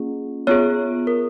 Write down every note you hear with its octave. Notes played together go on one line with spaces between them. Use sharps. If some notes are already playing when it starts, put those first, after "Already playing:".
Already playing: A#3 C#4 F4 G#4
B3 F4 G#4 C#5
A#4